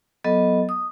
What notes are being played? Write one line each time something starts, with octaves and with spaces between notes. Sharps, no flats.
F#3 B3 A4 D#5
D#6